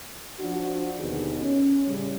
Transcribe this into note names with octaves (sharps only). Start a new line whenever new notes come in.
F3 D4 F#4
D#2 B2 D3 B3 D#4 G#4
C#4
A2 C#3 G3